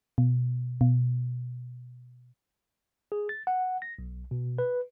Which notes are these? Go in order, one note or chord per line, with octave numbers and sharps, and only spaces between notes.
B2
B2
G#4
A6
F#5
A#6
B1
B2
B4